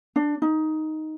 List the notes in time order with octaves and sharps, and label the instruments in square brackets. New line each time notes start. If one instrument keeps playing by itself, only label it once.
[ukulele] D4
D#4